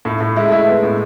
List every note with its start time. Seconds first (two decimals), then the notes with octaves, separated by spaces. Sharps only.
0.05 A2 A3
0.20 A2 A3
0.36 G#3 E4
0.48 A3
0.51 G#3 E4
0.68 B3
0.83 A2